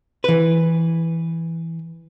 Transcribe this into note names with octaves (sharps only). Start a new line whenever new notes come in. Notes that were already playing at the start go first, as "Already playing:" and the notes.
E3 B4